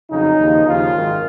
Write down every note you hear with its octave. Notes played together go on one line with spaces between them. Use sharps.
F2 C#3 F#3 D#4
D#2 C#3 F3
D#2 C#3 F3 F4
G#1 F#2 D#3